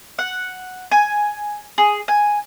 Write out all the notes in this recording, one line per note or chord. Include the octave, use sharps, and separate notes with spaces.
F#5
G#5
G#4
G#5